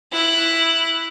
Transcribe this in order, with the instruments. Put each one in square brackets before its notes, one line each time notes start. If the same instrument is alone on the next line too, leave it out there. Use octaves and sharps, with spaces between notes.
[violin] E4 F#6